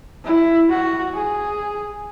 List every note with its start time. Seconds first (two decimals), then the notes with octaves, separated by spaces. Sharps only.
0.25 E4
0.70 F#4
1.15 G#4